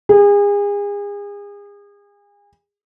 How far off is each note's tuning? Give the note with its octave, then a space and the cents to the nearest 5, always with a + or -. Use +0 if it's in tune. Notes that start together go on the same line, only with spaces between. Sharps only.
G#4 -35